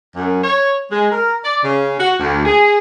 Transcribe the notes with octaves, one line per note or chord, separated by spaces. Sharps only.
F#2
C#5
G#3
A#4
D5
C#3
F#4
D2
G#4